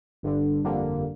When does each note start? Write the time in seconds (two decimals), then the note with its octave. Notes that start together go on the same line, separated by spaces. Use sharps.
0.23 G1 G2 D3
0.64 G1 F2 D3 G3 A#3